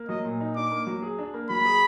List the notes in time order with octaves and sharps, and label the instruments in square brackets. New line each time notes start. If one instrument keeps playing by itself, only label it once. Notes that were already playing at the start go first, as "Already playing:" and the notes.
Already playing: [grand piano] A#3
[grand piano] F#3 [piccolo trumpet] D#5
[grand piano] A#2
D#4
[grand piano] D4 [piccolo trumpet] D6
[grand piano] A#3
F#3
G#4
D4
A#3
[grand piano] F#3 [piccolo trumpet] B5
[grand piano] G#4